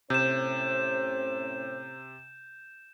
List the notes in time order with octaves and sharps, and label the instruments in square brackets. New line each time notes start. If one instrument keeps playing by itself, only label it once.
[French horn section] A2 C#4 C5 [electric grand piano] C3 [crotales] G6 E7